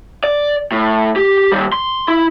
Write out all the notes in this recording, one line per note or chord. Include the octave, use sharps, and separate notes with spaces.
D5
A2
G4
D#2 G3
C6
E4